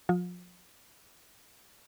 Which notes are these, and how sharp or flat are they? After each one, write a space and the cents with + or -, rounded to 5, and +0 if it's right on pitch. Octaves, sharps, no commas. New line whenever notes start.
F3 +35 F4 +30